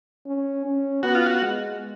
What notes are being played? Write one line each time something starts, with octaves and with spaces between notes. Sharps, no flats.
C#4
C#4
B3 F#4
F4
F#4
G#3